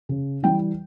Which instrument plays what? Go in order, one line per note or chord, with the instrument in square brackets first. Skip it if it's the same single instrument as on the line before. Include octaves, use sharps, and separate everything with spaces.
[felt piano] C#3
E3 G3 G5